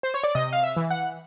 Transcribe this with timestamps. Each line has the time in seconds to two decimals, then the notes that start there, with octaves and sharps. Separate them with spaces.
0.03 C5
0.14 C#5
0.24 D5
0.35 C3 D#5
0.53 F5
0.63 E5
0.77 E3
0.90 F#5